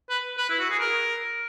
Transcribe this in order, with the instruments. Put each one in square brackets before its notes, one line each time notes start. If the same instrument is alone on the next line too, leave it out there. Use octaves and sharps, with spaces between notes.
[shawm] B4
B4
E4
F#4
G#4
A#4